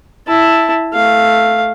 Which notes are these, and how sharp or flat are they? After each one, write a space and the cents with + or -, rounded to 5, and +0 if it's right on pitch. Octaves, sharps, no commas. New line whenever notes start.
E4 +0 A5 +0
A3 +0 F5 +0